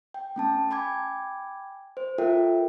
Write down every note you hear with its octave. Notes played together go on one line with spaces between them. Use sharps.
G5
A3 C#4 A5
G5 G#5 B5 D6 G#6
C5
F4 A4 A#4 E5 G5